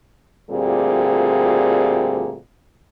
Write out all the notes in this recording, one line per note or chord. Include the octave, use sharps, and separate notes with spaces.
D2 A#2 G3 C4 F4 G#4